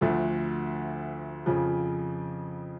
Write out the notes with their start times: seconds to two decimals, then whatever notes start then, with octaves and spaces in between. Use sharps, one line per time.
0.01 D2 D3 F3 A3
1.46 F2 C#3 F3